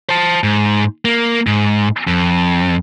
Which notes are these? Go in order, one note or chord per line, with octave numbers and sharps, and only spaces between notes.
C5 A5
G#2
A#3
G#2
F2